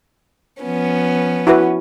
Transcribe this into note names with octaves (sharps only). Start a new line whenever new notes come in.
F3 B3 C#4
E4 F#4 B4